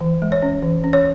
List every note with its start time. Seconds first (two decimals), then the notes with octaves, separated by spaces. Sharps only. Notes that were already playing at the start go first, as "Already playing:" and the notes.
0.01 E3
0.22 G#3
0.32 C#5
0.42 C#4
0.63 E3
0.84 C#4
0.93 C#5